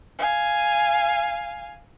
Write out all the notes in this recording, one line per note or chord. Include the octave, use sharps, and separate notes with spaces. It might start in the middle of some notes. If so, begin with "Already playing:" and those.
F5 G#5